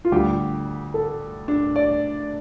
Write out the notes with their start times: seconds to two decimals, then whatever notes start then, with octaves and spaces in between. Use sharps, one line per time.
0.05 F4
0.12 D2 D3 G3 G4
0.94 A4
1.48 D4
1.76 D5